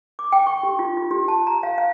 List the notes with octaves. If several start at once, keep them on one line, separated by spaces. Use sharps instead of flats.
D6
G5
C#6
G4
F4
F4
G4
A5
A#5
F5
F5